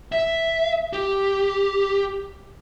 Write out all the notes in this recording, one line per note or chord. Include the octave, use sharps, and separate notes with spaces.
E5
G4